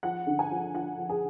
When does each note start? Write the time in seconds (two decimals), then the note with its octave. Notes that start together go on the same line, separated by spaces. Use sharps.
0.03 F3 F#5
0.27 D3
0.39 G#5
0.51 F3
0.74 F3 F#5
0.98 F3
1.09 G#4